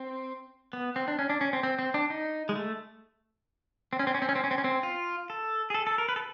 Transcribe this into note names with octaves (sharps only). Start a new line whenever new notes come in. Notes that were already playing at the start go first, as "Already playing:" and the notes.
Already playing: C4
B3
C4
D4
C#4
D4
C#4
C4
C4
C4
D4
D#4
G#3
A3
C4
C#4
C4
C#4
C4
C#4
C4
C#4
C4
C#4
C4
F4
A4
G#4
A4
A4
A#4
B4
A4